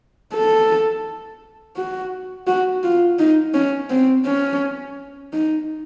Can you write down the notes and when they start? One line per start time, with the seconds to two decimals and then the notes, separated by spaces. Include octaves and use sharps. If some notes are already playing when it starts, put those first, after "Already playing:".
0.34 A4
1.77 F#4
2.47 F#4
2.84 F4
3.19 D#4
3.54 C#4
3.90 C4
4.26 C#4
5.33 D#4